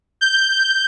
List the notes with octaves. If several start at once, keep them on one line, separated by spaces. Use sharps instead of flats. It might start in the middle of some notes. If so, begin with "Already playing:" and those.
G6